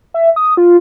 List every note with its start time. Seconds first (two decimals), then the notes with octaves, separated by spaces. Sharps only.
0.14 E5
0.36 D#6
0.57 F4